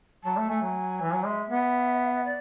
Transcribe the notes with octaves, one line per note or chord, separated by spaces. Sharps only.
F#3 A5
A3
A3 G#5
F#3
E3
F#3
G#3 E5
B3
D5